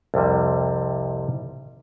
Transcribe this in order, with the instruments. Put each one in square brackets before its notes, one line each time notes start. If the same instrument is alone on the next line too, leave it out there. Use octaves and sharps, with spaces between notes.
[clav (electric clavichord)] C2 F2 C3 G3